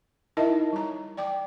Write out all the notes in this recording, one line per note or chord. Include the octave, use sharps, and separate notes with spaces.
D#4 E4 A#4 D#5 E5 A5
G3 A#5
D5 G5 D6